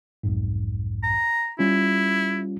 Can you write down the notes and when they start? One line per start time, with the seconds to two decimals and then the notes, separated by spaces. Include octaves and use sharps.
0.23 B1 F2 G#2
1.03 A#5
1.59 G3 C#4 E4 F4